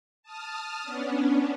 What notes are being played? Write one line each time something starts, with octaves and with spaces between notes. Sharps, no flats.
A5 D#6 F6
B3 C#4 D4